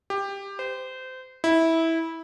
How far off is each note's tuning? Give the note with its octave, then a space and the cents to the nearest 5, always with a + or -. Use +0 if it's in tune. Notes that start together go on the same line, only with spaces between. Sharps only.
G4 +15
C5 -25
E4 -15